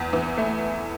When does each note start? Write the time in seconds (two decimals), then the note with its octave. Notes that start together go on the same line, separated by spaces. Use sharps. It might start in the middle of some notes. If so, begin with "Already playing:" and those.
Already playing: E2
0.13 E3
0.37 A3